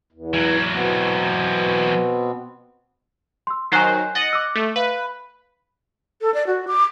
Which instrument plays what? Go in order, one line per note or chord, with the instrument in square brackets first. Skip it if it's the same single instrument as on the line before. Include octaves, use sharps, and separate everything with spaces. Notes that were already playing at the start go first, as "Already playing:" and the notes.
[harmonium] E2
[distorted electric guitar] E3 F#3
[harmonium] B2 B3 C4
[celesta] C6 E6
[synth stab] D#3 F#3 C5 [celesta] G#5 F#6 C7
[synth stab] D#5 F#5 [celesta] A6
[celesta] D6 E6
[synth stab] A3
[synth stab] B4 [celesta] F5
[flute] A4
D5
F#4
D6